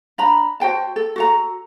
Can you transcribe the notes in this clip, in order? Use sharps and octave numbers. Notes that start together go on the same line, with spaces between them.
D4 A#5 B5
F#4 C5 G5 A5
A4
F#4 A4 A#5